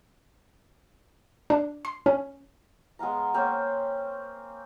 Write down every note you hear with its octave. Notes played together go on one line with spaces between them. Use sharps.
D4
C6
C#4
G#3 B3 F5 A#5
A#3 C4 C#4